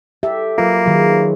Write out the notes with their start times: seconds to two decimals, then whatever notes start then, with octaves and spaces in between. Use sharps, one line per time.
0.23 G4 A4 E5
0.58 F#3 A#3 F4 B4
0.86 D#3 F#3 G#4 C#5 D5